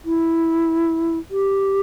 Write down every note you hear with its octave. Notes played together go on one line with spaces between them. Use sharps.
E4
G4